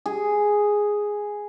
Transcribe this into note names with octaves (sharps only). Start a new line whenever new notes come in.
G#4